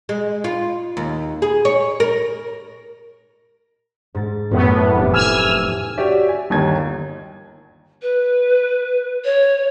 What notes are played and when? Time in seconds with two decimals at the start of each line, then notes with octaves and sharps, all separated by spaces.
0.09 G#3
0.44 F4
0.97 D#2
1.42 G#4
1.65 C#5
2.00 A#4
4.15 G#2 A6
4.51 A1 F#2 A2 B3
4.95 F1 D6 A6
5.13 G#5 E6 F6
5.98 F#4 G4 C#5 D5 E5
6.29 G#5
6.50 G1 D#2 D#3 G#6
8.02 B4
9.24 C#5